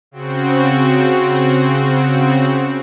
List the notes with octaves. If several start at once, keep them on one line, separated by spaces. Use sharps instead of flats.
C#3 C4 F#4